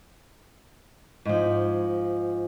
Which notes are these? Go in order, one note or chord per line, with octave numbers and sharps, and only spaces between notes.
G#2 F3